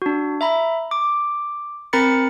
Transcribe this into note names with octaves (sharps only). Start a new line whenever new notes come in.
D4 F#4
E5 A#5 B5
D6
C4 A#4 A#5 B5 A6 C#7